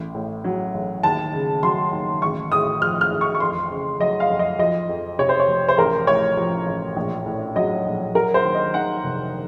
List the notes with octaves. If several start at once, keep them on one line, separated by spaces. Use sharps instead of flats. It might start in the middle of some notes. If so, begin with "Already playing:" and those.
Already playing: A1
A2
F#3
A1
D#2 A5
C#3
F#3 C6
D#2
A1 C#6
A2 D#6
F3 F6
F6
A1
C#6
C#6
F2 C6
C#3
F#3 D#5
F5
F2
D#5
F3 D#5
F2
C3 C#5
C5
C#5
F1
C5
A1 A#4
A2 C#5
F3
A1
A#1
A2
F#3 D#5
A#1
F#3 A#4
C5
D#2
D#5
D#3 F#5
F1